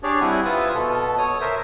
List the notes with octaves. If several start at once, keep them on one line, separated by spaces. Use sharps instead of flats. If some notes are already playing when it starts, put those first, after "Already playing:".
D4 G4 G#4 C#5 D5
G3 C4 E4 F#5 G#5
F4 B4 E5 D#6
B2 A4
C#5 D#6
A#4 C5 E5